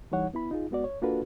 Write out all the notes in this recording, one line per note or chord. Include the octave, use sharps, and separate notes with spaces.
E3 G3 D#4 C#5 F#5
B3 E4 B5
D#4 F4 G#4
G#3 B3 F#4 D5
C#5
A#3 D4 F4 F#4 A4 B4